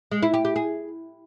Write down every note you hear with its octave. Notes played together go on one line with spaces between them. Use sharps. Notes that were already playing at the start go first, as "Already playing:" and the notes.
G#3
E4
G4
G4
G#4